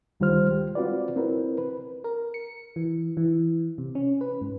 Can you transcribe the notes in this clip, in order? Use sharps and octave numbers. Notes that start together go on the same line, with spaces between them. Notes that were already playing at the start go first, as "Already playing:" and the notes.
D2 D#3 G3 F4 C5 F6
G#3 G4
C4 F4 F#4 B4 D5
C4 E4 A#4 B4
B4
A#4
C#7
E3
E3
C3
C#4
B4
G#2